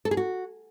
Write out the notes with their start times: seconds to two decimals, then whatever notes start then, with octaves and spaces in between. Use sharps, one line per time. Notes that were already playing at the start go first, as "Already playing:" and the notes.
0.05 A4
0.11 G#4
0.17 F#4